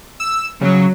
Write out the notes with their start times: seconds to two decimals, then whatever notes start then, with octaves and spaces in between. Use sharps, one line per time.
0.20 E6
0.61 C#3 F#3